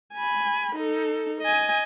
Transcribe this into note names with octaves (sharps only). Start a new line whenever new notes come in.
G#5 B5
D#4 A4
D#5 G#5